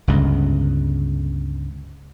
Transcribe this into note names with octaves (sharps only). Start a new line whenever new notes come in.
G1 C#2